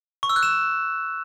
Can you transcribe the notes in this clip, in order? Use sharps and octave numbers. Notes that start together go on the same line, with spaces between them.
C#6
E6
F#6
E7